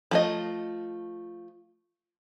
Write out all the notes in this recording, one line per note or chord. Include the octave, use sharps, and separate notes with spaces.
F3 A3 D#5